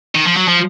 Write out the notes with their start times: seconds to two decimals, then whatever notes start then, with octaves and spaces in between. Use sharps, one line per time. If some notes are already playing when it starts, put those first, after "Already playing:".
0.15 D#3
0.25 F3
0.36 F#3
0.48 F3